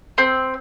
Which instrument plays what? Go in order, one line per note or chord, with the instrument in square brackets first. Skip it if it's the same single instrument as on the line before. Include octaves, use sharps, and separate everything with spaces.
[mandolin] C4